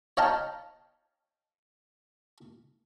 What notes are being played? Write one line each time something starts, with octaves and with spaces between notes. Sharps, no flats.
C#5 D#5 F5 G5 A5 A#5